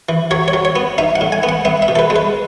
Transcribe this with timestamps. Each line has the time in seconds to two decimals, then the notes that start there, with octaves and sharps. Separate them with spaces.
0.09 E3
0.31 F#3 C#5
0.48 C#5
0.53 F#3
0.65 C#5
0.76 B3
0.98 D#4 E5
1.16 F#5
1.21 A2
1.32 G#5
1.43 B3
1.49 F#5
1.65 B3 E5
1.82 E5
1.88 B2
1.96 A4
1.99 B4
2.10 G#3
2.16 B4